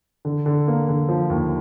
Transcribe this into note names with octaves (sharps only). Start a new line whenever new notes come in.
D3
D3
A#3
D3
F3
D#2